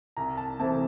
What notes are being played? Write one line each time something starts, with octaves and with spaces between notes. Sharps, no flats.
C2 A#5
A5
C3 E3 A3 C4 A5